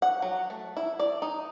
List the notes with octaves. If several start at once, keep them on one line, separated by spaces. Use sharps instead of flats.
F#5
F#3
A3
E4
D5
D#4